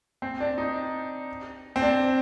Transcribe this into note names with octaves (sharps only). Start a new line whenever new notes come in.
C4
D4
D#4
C4
D4